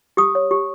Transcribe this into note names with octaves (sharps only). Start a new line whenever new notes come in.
G4 D#6
C#5
G4